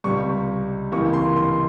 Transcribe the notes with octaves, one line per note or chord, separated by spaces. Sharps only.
C#2 C3 G3 C#6
C#2 C3 E3 A#3 C#6
C6
C6